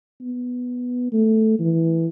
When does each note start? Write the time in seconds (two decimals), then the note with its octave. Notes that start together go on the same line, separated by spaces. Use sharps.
0.21 B3
1.13 A3
1.60 E3